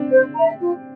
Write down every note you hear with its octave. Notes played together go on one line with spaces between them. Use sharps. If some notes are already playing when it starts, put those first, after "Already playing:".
Already playing: C4 D4
C5
E5 A#5
F4